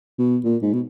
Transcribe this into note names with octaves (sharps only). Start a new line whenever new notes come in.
B2
A#2
G#2
B2